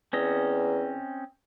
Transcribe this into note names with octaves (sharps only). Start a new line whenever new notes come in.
E2 C4 C#4 D#5